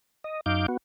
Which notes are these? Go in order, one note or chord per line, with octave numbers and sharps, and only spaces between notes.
D#5
F#2 D#4 F5 D6 G6
B3 F#4